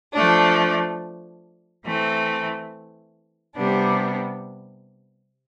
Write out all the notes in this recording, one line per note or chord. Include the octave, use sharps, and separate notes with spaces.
F3 A3 D4
E3 A3 C4
C3 G3 B3 D4